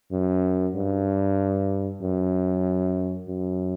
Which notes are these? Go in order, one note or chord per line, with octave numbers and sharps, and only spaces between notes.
F#2
G2
F#2
F#2